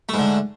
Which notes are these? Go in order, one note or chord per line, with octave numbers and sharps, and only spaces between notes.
G#2 D3 A3